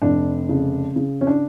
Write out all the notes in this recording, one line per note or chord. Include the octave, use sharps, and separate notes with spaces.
F1 D4
C#3
C#3
C#4
D4